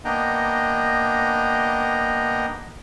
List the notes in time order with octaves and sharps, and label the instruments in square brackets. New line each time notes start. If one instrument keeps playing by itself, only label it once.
[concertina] A#3 B3 D4 D#5 G5 A#5